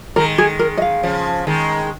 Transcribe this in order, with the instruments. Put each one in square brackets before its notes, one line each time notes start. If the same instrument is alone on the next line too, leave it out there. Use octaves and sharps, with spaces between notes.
[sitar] D#3 G#3 [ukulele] A#4
[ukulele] G#4
A#4
D#5
F5
[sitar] C#3 F3
D#3 G#3